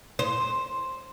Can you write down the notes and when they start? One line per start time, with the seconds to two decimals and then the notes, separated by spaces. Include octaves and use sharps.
0.19 C5